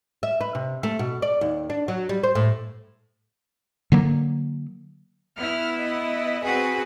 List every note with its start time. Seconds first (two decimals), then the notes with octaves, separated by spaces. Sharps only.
0.23 E5
0.41 B4
0.55 C3
0.83 A3
0.99 B2
1.22 D5
1.41 D#2
1.70 D4
1.88 F#3
2.09 G3
2.23 C5
2.35 A2
3.92 D3 F#3 A#3
5.38 B3 E4 F6
5.78 D#5
6.44 C4 F#4 G#4 B4